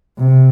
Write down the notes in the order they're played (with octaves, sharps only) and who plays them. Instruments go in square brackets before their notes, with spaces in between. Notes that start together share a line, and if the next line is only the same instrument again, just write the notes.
[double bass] C3